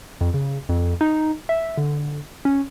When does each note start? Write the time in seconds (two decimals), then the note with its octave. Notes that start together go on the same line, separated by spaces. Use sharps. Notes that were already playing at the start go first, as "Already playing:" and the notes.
0.21 F2
0.34 C#3
0.69 F2
1.01 D#4
1.49 E5
1.77 D3
2.45 C#4